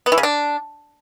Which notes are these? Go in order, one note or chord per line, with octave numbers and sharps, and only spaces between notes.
B3
E3
C#3
D4